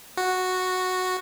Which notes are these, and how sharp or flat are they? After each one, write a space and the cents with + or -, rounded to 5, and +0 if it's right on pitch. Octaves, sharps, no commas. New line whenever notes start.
F#4 -5